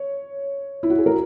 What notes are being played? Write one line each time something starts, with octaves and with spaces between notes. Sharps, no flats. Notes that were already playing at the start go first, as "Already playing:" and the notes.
Already playing: C#5
E4
F#4
G#4
A#4